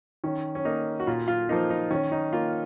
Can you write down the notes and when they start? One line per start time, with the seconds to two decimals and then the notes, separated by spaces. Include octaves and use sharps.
0.24 D#3 C#4
0.55 C#4
0.65 A#3 D#4
1.00 F#4
1.07 A#2 F4
1.28 F4
1.49 F3 A#3 D#4
1.70 D#4
1.91 D#3 C#4
2.12 D#4
2.33 A#3 F4